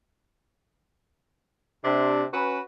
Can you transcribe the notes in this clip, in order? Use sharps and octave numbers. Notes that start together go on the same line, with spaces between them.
C3 D4
C#4 F#4 B4